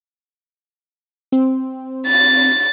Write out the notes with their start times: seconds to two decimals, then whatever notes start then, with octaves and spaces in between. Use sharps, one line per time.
1.32 C4
2.07 A6